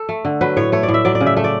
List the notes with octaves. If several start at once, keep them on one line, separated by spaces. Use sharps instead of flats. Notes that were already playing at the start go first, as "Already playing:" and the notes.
Already playing: A4
A3
D3
F#3 B4
A2 C#5
A3 C#5
D5
A2
E5
F#3 D5
D5
C#3
E5
A3 E5
D5